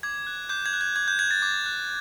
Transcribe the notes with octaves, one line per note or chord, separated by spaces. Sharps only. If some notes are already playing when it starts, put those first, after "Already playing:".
D6 G#6
F#6
D6 G6
G#6
F#6
G#6
D6 G#6
G6
F#6 G#6
A6
D6
F#6